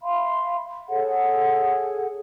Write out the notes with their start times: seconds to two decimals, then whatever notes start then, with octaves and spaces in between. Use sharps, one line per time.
0.02 E5 F5 B5 C6
0.88 G#4 A4 C#5 F#5